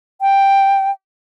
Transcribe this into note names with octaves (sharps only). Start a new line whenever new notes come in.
G5